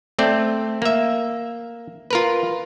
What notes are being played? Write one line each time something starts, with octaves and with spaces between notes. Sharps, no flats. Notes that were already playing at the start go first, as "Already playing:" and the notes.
A3 C4 D5
A#3 E5
F4 A#4 B4